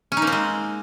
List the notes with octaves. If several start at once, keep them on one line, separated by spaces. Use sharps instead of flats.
C#4
D#4
A#3
C4
G#3